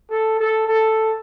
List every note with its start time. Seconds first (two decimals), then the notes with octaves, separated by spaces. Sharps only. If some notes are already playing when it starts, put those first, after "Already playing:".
0.10 A4
0.39 A4
0.67 A4